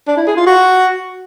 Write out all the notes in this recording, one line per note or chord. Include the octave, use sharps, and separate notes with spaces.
D4
E4
G#4
F4
F#4